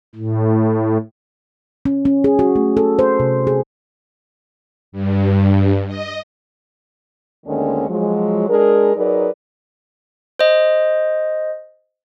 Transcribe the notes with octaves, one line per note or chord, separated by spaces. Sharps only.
A2
C#4
C#4
G#4
F#4
A3
A4
C5
C3
G#4
G2
D#5
D2 D3 D#3 G#3 A#3 C#4
F3 F#3 G#3
G#3 D4 G#4 A#4
F#3 D#4 G#4 A#4 B4 D5
C5 D#5